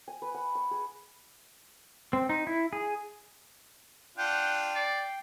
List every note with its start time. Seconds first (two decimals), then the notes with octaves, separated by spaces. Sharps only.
0.08 G#5
0.22 B4
0.34 F#5
0.55 C#6
0.71 G#4
2.13 C4
2.29 D#4
2.47 E4
2.73 G#4
4.18 D4 F4 F#5 G5 G6
4.75 D5 C7